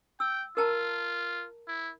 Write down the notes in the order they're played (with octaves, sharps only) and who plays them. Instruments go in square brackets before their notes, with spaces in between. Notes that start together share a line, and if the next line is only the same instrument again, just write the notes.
[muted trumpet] G5 [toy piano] E6
[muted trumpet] F4 [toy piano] A#4 A5 A#5
[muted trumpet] E4